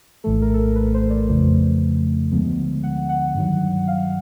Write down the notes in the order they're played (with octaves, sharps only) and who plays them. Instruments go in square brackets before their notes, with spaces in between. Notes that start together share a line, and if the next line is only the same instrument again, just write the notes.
[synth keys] A#1 A2 E3 A3 A4
A#4
A4
A#4
B4
B4
C5
D5
F2 C#3 F3 A3
D2 D3 F3 G#3 B3
F#5
F#5
G2 D#3 F#3
F5